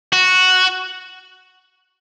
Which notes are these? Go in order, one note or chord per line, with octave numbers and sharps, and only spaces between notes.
F#4